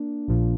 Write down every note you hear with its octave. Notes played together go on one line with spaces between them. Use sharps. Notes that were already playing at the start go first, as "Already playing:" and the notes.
Already playing: A#3 D4
A#1 A#2 F3